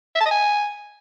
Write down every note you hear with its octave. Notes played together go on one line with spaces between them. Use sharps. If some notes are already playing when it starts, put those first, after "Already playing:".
E5
A5
D#5
G#5